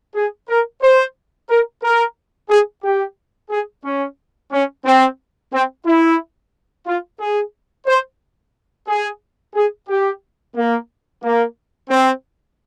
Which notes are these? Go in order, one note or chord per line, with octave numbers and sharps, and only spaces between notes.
G#4
A#4
C5
A#4
A#4
G#4
G4
G#4
C#4
C#4
C4
C4
E4
F4
G#4
C5
G#4
G#4
G4
A#3
A#3
C4